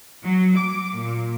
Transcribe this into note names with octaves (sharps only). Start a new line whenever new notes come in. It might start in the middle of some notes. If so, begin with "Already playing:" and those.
F#3
D6
A#2